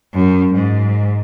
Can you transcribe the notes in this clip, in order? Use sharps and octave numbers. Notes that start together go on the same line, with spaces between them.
F#2
G#2